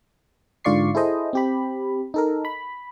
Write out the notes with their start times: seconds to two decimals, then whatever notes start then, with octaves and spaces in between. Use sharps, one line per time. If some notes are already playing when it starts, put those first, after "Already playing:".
0.64 G#2 D3 F4 D5 C#6 C7
0.95 E4 G#4 A4 C5 D#5
1.33 C4 G4 B5
2.14 D#4 A4 A#4
2.45 B5